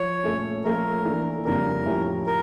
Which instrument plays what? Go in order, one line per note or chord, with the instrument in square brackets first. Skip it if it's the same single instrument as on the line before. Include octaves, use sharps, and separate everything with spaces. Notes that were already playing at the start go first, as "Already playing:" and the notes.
Already playing: [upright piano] F3 [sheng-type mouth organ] C#5
[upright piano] A#2 A3 C#4
[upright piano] F3 A3 C#4 F4 A4 [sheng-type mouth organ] A#4
[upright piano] E3 A#3 D4 A4
[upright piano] F2 C#3 G3 A#3 D4 [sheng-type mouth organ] A#4
[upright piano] A2 F3 C#4 E4 G4
[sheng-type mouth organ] A#4